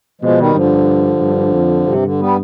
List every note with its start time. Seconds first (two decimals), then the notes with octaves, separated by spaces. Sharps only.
0.21 B2 F3 G#3
0.38 D#3 G3
0.54 G2 D3 F3
1.21 G2
1.54 F2
1.87 G2 C3
2.03 D3
2.19 G3 B3